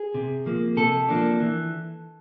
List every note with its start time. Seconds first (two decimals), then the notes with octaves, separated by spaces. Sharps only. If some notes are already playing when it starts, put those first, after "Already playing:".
Already playing: G#4
0.14 C3
0.46 F3 A#3
0.77 C3 A4
1.09 F3 A#3 D4
1.40 E3